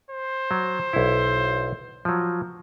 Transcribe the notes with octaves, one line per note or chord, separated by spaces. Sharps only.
C5
F#3
B1 E4
F3 F#3